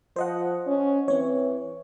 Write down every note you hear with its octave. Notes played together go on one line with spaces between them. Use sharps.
F3 C5 D#5 F#5
C#4
E3 C4 C#5